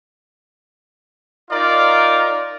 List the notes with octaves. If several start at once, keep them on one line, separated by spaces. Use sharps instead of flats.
D#4 F4 A#4 D5